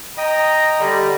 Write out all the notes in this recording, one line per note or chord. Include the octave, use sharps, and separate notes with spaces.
D#5 G5 A#5 D#6
D3 G3